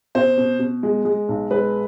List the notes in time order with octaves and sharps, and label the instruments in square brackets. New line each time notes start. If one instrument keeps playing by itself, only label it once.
[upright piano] B2 C5
B2
B2
G#3
G#3
B1
G#3 B4